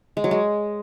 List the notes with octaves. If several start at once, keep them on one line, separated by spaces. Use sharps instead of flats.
G#3
F#3
G#3